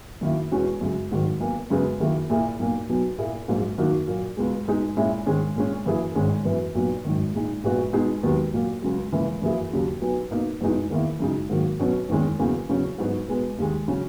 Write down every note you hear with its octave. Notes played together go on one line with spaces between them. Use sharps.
F#2 D#3 A#3 E4
E2 B2 G#3 C#4 F#4
F#2 C#3 G#3
G#1 G#2 D#3 F#3
B1 B2 A#3
F#2 C#3 G#3 B3
F#2 D#3 A#3 E4 G#4
A#2 A#3 E4 G#4
B1 A#2 A#3
B1 B2 F#3
A#2 A#3 E4 G#4
A#1 G#2 F#3 A#3
F#2 D#3 A#3 D#4 F#4
A#2 F#3 A#3
C#2 B2 G#3
B2 G#3 D#4 G#4
A#2 G#3 C#4 E4
G#2 D#3 G#3 C#4
A#2 G#3 C#4
F#2 E3 A#3 E4 G#4
G#1 G#2 D#3 G#3 C#4
F#2 E3 B3
B1 A#2 F#3 B3 F#4
G#1 F#2 D#3
A#2 G#3 D#4
A#1 A#2 G#3 B3 F#4
B2 G#3 B3 D#4 G#4
E1 D#2 D#3 F#3 B3
A#2 F#3 A#3
C#2 C#3 F#3
C#2 C#3 E3 A#3
F#2 E3 A#3 E4 G#4
D#2 C#3 F#3
B1 B2 F#3 B3
B2 A#3 D#4
F#1 E2 B2 G#3 D#4
E2 D#3 A#3 E4
F#2 C#3 G#3 D#4
G#2 D#3 F#3 A#3
B2 F#3 C#4
F#1 E2 D#3 G#3 C#4
E2 C#3 F#3 A#3
E2 C#3 F#3 C#4
G#2 F#3 B3 D#4 F#4
B2 G#3 B3
D#2 D#3 G#3
C#3 F#3 C#4